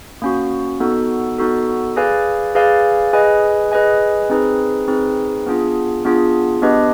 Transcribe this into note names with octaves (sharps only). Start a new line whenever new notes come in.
A#3 C#4 F#4
B3 D#4 F#4 A4
B3 D#4 F#4 A4
G#4 B4 D5 F5 G#5
G#4 B4 D5 F5 G#5
G#4 B4 D#5 G#5
G#4 B4 D#5 G#5
C4 D#4 G#4 B4
C4 D#4 G#4 B4
B3 D4 F4 G#4
B3 D4 F4 G#4
B3 D4 G4 B4 D#5